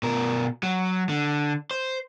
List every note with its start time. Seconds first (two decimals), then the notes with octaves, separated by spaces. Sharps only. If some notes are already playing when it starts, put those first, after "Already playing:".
0.03 B2 A#4
0.63 F#3
1.09 D3
1.71 C5